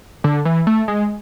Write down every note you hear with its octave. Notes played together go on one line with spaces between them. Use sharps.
D3
E3
A3
G#3